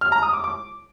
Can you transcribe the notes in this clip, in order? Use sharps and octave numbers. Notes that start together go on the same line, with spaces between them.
F6
A#5
D#6
D6
D6